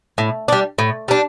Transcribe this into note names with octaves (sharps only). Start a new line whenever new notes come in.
A2
G3 D4
A2
G3 D4